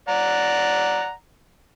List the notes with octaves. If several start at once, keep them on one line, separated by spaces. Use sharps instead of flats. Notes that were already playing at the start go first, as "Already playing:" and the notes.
D5 F#5 A#5